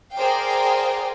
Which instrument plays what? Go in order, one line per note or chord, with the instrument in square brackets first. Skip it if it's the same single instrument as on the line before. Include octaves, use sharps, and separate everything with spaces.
[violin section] G#4 A#4 C5 D5 F5 G5